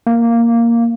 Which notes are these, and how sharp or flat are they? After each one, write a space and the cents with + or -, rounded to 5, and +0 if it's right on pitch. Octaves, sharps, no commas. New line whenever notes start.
A#3 +0 F5 -10